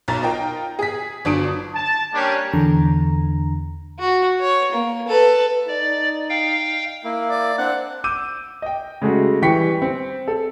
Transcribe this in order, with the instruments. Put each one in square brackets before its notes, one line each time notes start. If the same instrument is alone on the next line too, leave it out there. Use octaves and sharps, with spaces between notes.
[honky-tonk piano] B1 A#5 A6
D#4 F4 A#4 G5
G#4 B6
G1 F#3 D4 D#6 D7
[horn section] A5
G3 A#3 C#4 D4 G4 C#5
[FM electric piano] E2 D3 A#5
[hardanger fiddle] F#4
C#5
A#3
A4 B4
[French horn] D#4 [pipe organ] D5
[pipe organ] F5 G5
[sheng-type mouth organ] A#3 E4
[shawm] D5
[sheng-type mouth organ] C4 D4 [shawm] F#5
[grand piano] D6 E6 G6 D#7
D#5 G5
C#3 G#3 A3 F#4
E3 G3 G5 C#6 B6 C#7
C4
A4